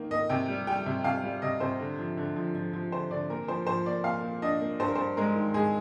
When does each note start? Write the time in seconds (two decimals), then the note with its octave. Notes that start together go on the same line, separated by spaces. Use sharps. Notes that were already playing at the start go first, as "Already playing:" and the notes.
Already playing: D#3 A#3
0.11 A#3 D#5
0.29 C3 G5
0.48 G3
0.67 G3 G5
0.86 C3
1.04 C3 F5
1.24 G3
1.42 C3 D#5
1.60 C3 C5
1.80 D3
1.99 F3
2.17 D3
2.36 F3
2.55 F3
2.73 F3
2.92 D3 C5
3.11 D3 D5
3.30 A#2 A#4
3.48 F3 C5
3.67 F3 C5
3.85 A#3 D5
4.04 A#2 F5
4.23 A#2
4.42 D4 D#5
4.61 A#3
4.80 G2 C5
4.88 A#4
4.95 G2 C5
5.17 G#3 A#4
5.36 D#3
5.54 G#3 G#4